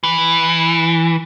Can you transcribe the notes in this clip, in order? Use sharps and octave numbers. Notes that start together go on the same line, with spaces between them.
E3